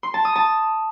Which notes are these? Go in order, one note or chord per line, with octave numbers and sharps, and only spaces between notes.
C6
A5
D#6
A5